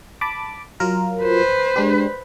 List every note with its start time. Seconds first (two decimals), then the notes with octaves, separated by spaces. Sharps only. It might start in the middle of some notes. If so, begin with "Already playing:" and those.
0.21 A5 B5 D6
0.80 F#3 F4 A#4
1.22 B4 C5
1.76 G#3 D4 G4